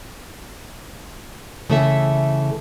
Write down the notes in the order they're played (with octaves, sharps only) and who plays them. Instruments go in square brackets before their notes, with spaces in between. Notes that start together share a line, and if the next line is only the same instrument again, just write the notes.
[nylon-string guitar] C#3 E3 A3 A4 D5 E5